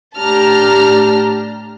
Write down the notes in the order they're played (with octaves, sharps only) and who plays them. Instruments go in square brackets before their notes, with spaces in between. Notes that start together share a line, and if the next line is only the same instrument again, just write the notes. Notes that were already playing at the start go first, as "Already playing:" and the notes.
[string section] A2 D4 G4 A5 A#5 F6